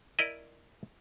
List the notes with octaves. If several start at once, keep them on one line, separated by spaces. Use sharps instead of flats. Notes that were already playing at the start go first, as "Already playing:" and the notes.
E4 A#4 D5 D#5